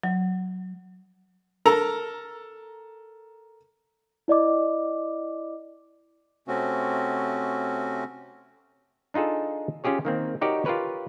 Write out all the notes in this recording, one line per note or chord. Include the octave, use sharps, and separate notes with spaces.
F#3
A4 A#4 A#5
E4 D5 D#5 D6
C3 A3 C4 C#4 F#4
D4 D#4 F4 G#4 A4
C#4 F4 G4 G#4 C#5
D#3 A#3 C4
D#4 F#4 G4 A#4 C#5 D5
F4 G4 A#4 B4 C#5